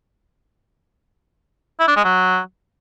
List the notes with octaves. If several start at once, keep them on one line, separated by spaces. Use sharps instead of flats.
E4
D4
G#3
F#3